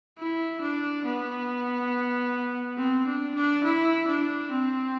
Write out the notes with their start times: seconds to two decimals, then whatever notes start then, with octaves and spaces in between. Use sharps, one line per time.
0.18 E4
0.61 D4
1.05 B3
2.77 C4
3.06 D4
3.35 D4
3.63 E4
4.08 D4
4.50 C4